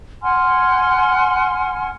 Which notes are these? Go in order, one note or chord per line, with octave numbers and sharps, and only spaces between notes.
F#5 G#5 C6 F6